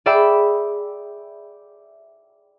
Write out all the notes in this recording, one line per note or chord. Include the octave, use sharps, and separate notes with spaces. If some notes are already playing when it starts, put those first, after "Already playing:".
G#4 D5 E5 G5 B5 E6